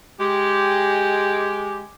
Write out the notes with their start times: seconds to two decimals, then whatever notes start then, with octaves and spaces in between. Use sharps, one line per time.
0.19 G#3 G4